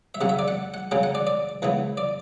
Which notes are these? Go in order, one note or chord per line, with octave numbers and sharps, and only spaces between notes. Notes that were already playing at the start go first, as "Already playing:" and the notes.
E5
C#3 F#3 C#4 F#5
E5
D5
F#5
F#5
C#3 F#3 C#4 G5
F#5
D5
D5
C#2 C#3 E3 B3
D5